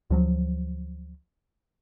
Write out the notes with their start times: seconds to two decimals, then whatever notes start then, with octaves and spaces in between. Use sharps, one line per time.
0.10 D2 F3 F#3